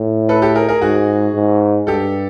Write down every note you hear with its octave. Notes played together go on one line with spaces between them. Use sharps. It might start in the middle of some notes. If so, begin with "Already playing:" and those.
Already playing: A2
A4 B4
G4 A4
G#4 A#4
G#4 A#4
G#2 F#4 G#4
G#2
G2 G4 A4